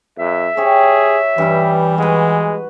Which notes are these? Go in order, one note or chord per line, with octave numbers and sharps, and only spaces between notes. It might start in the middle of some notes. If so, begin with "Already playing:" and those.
F2 E5
G4 G#4 C#5
G2 E3 G3 D#4
G#3 F#4 B4